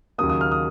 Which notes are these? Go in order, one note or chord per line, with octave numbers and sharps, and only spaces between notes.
D#2 C#3 F#3 A#3 D#6
D#6
F6
D#6